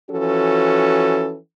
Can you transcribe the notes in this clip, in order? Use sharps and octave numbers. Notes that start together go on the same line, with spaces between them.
E3 F3 C#4 F#4 A4